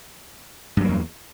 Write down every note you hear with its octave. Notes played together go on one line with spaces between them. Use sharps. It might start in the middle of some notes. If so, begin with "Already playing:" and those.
E2 G2 F#3 A#3